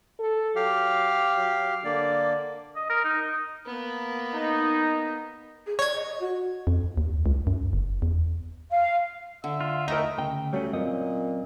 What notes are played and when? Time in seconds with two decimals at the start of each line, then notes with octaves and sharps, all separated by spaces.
0.19 A4
0.56 F#3 G4 F5
1.37 F#3
1.85 D3 A#3 D5
2.76 D#5
2.90 A#4
3.05 D#4
3.22 D#5
3.66 A#3 B3
4.32 D#4
5.67 G#4
5.79 C#5 D5 G#6
5.95 D#5
6.20 F#4
6.67 F2
6.97 D#2
7.26 C#2
7.47 F#2
7.73 F#1
8.02 E2
8.71 F5
9.44 D3 E5
9.61 F4
9.88 A3 D#4 E4 A#4 D#5 E5 G5 A#5
10.18 D2 C#3 G5
10.53 F#3 G3 A3 C#4
10.73 F#2 A#2 C4 D#5